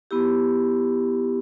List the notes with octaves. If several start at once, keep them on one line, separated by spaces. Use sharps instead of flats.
B3 E4 G4